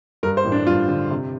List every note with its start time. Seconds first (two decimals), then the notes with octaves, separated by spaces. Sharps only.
0.23 G2 A#4
0.37 C5
0.45 A1
0.52 D4
0.67 G2 F4
0.88 D3
1.10 C3